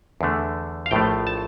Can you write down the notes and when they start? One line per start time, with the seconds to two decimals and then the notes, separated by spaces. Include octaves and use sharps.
0.21 E2 D3 A3
0.86 F5
0.91 A#1 A2 F3 A3 G5
1.27 A5